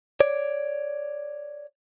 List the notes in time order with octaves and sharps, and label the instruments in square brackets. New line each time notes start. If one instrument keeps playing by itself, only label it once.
[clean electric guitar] C#5 D5